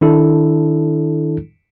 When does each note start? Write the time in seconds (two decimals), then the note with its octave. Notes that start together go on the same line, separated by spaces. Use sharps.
0.01 D#3 D4 E4 A4